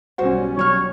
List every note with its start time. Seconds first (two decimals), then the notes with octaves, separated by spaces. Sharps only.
0.18 B1 G3 C#4 F#4 C5
0.57 F#3 C#5 C#6 F6